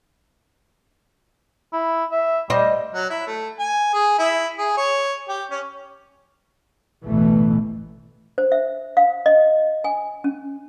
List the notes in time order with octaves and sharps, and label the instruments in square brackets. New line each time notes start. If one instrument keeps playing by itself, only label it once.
[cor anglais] E4
E5
[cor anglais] G3 [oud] C5 D#5
[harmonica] F#3
E4
A3
G#5
G#4
E4
G#4
C#5
G4
C#4
[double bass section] A1 D2 B2 E3 A3
[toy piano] C5
E5
F5
D#5
G#5
C#4